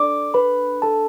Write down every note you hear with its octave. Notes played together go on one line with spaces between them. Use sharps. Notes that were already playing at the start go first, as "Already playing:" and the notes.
Already playing: D4 A4 D5 D6
B4 B5
A4 A5